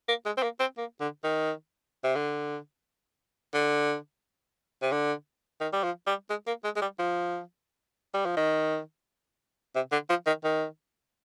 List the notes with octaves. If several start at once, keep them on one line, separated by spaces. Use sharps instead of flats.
A#3
G#3
C4
A#3
C4
A#3
D3
D#3
C3
D3
D3
C3
D3
D#3
G3
F3
G3
G#3
A#3
G#3
G#3
G3
F3
G3
F3
D#3
C3
D3
F3
D#3
D#3